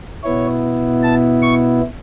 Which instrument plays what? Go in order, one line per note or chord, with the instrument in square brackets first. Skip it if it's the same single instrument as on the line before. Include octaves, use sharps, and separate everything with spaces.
[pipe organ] B2 B3 E4 C#5
A5
C#6